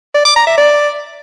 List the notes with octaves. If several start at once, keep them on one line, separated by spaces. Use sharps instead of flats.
D5
D6
A#5
E5
D5